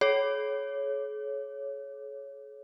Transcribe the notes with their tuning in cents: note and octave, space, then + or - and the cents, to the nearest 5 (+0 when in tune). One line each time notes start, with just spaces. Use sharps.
G#4 +45 C#5 +0